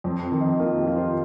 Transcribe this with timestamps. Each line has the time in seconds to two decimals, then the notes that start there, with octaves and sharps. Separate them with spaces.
0.04 F2 C4
0.23 C4
0.32 D#3
0.41 D#4
0.60 A#3 F4
0.79 G4
0.87 F4
0.96 C5